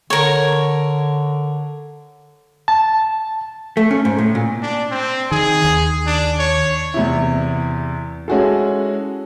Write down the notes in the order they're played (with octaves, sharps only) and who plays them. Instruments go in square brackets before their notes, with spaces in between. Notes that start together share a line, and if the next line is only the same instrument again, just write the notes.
[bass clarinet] D3 [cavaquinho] A#4 C#5
[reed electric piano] A5
[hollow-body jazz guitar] A3
C#4
G#2
A2
A#2
[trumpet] D4
C4
[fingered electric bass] D#3 [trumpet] G#4
[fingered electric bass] D#2
[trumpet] D4
C#5
[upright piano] E2 C3 E4
G#3 C#4 E4 F#4 G#4 A4